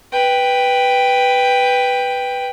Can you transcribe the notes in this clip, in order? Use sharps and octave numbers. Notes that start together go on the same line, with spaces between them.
B4 G5